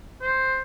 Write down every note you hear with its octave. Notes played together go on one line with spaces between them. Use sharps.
C5